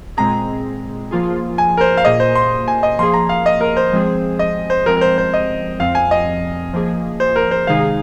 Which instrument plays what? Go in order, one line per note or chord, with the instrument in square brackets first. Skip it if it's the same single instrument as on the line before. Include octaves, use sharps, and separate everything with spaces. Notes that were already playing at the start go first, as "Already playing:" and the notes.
[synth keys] A#2 G#3 C4 G#4 [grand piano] A#5
[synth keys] F3 A#3 F4 G#4
[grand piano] G#5
A#4
C5
F5
[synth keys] A#2 A#3 G#4 [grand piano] D#5
[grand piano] C5
C6
G#5
D#5
[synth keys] F3 A#3 G#4 [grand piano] C6
[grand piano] A#5
F5
D#5
A#4
C5
[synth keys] F3 G#3 C4 G#4
[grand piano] D#5
C5
[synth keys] F3 G#3 C4 [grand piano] A#4
[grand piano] A#4
C5
C5
D#5
[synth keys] F2 F3 C4 [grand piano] F5
[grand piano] G#5
D#5
[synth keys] F3 A#3 G#4
[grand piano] C5
A#4
C5
[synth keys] C3 D#3 G#3 D#4 G#4 [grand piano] F5